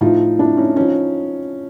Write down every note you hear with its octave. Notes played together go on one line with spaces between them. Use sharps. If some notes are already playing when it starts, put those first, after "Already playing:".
A2 F3 D#4 F4
D4 E4
C#4 D#4
F3 C#4 D#4